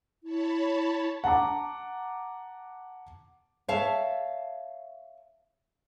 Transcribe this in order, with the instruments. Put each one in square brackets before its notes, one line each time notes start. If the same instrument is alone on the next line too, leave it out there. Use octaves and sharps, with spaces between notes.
[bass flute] E4 [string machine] C#5 A5 B5
[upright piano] F#5 A5 A#5 D6
[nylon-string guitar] C#5 E5 F5 A5